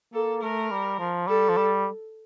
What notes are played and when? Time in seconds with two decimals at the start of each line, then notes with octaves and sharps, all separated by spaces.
0.13 A#3 A4
0.42 A3 A#4
0.71 G3
0.99 F3
1.28 G3 A4
1.49 F3
1.57 G3